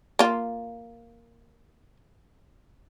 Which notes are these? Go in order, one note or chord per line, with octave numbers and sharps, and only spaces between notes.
A#3 F4